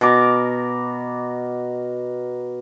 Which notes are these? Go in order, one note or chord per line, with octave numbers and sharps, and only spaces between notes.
B2 A#4 D6